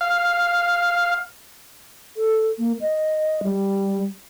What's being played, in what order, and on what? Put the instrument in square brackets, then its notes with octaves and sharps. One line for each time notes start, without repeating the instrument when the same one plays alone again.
[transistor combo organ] F5
[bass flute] A4
A#3
D#5
G3